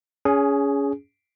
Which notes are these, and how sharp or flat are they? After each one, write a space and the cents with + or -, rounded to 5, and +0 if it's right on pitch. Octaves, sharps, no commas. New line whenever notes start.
C#4 +25 G#4 +0